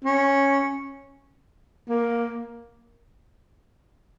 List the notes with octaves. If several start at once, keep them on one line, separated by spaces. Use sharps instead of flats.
C#4
A#3